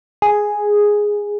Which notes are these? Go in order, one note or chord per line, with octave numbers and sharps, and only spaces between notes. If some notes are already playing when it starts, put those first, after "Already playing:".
G#4